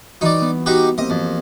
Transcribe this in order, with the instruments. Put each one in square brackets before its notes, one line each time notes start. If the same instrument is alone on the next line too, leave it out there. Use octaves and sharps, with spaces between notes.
[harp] E3 F#4 [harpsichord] D#4 D5
[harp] B3
[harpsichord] D#4 F#4 G4
[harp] A#3 C4 G4 [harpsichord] D#5
[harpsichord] F2